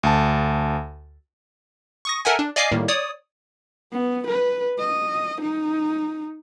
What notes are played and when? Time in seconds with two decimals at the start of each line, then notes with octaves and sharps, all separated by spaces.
0.03 D2 A5
2.05 C#6 D#6 A#6
2.25 A4 A#4 E5 F#5 G#5
2.39 D4
2.56 D5 D#5 F5 G#5 D6 C7
2.71 A2 D#3 G3 A#3
2.88 C#5 D5 D#6
3.93 B3
4.27 B4
4.79 D#5
5.42 D#4